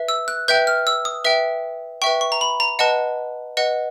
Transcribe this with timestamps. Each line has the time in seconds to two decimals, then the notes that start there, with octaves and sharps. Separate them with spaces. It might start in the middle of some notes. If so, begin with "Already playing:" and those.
Already playing: B4 E5
0.08 E6
0.28 F#6
0.48 B4 E5 G5 G6
0.67 F6
0.87 E6
1.05 D#6
1.25 B4 E5 G5
2.02 B4 E5 G5 C#6
2.21 C#6
2.32 A#5
2.41 B5
2.60 A#5
2.79 B4 D#5 F#5 A5
3.57 B4 D#5 F#5